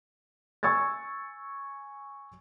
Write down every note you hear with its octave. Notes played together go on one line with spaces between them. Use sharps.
G#5 C#6 E6 G#6 A6